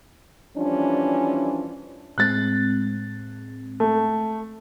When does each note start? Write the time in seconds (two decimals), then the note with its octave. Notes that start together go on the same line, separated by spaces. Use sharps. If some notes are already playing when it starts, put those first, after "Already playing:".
0.57 E3 F3 G3 C#4 D4
2.18 A2 G#3 C4 F#6 A6
3.80 A3